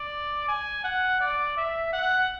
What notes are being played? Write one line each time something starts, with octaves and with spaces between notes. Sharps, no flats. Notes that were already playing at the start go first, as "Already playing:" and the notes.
Already playing: D5
G#5
F#5
D5
E5
F#5